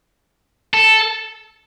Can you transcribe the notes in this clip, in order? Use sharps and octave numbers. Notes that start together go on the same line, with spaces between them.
A4